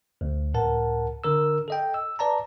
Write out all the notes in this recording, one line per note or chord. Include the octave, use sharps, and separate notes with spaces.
D2
C#2 A2 A#4 F#5 A5
D3 A#4 E6
A4 D#5 G5
E6
B4 D5 A5 A#5